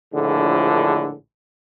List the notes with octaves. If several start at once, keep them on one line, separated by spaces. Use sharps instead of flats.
A#1 A2 D3 D#3 F3 G#4